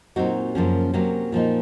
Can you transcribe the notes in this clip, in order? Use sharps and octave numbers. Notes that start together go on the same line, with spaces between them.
A#2 F#3 C4 D#4 F#4
F#2 C#3 F3 A#3 C#4
C3 F#3 A#3 C#4 F#4
A#2 F3 A#3 D#4